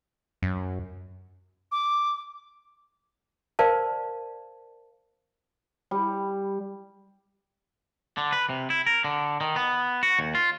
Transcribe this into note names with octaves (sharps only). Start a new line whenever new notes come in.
F#2
D6
A#4 C5 D5 F5 A5
G3
D3
B4
C3
E4
A#4
D3
D#3
B3
F#4
D#2
F4